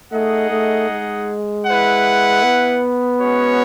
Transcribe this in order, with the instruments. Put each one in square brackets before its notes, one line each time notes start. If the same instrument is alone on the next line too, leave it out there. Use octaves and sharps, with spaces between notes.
[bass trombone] A3 [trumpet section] D#4 G#4 D#5 F#5
[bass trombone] A3
G#3
[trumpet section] E4 B4 F#5
[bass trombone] B3
[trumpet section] G#3 C#4 F#4 C#5